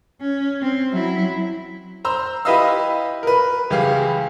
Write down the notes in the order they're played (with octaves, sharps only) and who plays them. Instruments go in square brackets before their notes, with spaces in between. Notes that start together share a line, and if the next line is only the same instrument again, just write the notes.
[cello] C#4
C4
F#3 E4
[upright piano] C5 A#5 C6 E6
E4 G4 B4 D#5 F5 E6
A#4 B4
C#2 E3 G4 G#4 F5